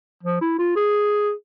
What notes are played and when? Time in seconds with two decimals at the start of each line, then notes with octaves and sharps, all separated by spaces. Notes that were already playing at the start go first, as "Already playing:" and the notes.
0.23 F3
0.41 E4
0.59 F4
0.76 G#4